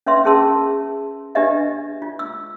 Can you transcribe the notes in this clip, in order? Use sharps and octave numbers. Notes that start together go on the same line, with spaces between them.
C#4 B4 E5 C6
C#4 G#4 A#4 A5 C6 E6
D4 G4 B4 D#5 E5
F4
E6